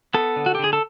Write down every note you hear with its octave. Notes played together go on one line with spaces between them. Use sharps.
B3 A4
D3
F#4
G4
D3 G#4
A4